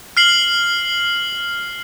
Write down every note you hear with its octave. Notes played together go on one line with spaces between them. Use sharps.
F6 C7 F#7